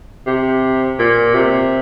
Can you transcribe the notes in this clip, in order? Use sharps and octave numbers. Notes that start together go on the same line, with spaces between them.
C3
A#2
C3